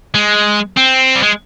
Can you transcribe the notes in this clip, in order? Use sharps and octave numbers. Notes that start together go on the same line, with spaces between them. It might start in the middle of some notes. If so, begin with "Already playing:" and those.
G#3
C4
G3
G#3